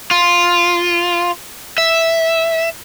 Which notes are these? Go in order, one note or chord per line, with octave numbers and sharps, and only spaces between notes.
F4
E5